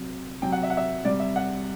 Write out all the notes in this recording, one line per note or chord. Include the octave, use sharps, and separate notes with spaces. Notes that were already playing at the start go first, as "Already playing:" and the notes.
Already playing: C3 F#3
C3 F#3 G5
F#5
E5
F#5
E5
C3 G3 D5
E5
F#5